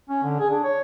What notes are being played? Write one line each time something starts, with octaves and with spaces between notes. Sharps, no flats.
C#4
D3
G#4
D4
C#5